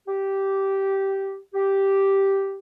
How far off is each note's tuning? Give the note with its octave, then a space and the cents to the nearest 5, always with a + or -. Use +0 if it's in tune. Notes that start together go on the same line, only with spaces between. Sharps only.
G4 -10
G4 -5